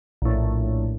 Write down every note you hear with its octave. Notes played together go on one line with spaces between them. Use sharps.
A#1 A2